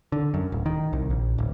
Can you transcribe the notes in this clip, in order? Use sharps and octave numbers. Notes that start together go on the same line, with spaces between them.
D3
F#2
D1
D#3
C2
A#1
D1